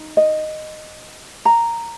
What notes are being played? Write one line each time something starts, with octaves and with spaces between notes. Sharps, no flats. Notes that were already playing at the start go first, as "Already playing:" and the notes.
Already playing: D#4
D#5
A#5